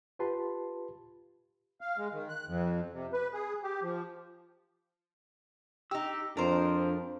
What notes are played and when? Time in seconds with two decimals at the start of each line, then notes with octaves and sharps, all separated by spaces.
0.19 F4 G4 B4 A5 C6
1.81 F5
1.98 G#3
2.13 D#3
2.29 F#6
2.47 F2
2.93 C3
3.13 B4
3.33 G#4
3.63 G4
3.82 F3
5.91 D#4 G4 E6
6.37 F2 D4 A#4 C5